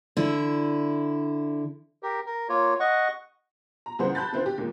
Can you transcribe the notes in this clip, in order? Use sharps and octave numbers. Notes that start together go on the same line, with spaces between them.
D3 E4
G4 A#4
A#4
A#3 F4 C#5
D#5 F#5 C#6
A#5
C#2 E3 G3 G#4 C5 F#5
A5 B5 F#6 G6 A6
D3 C4 E4 F4 C5
G4
D#2 A#2 G#3 A#3